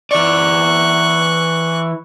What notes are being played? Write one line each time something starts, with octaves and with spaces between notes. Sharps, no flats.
E3 D5 C#6 F#6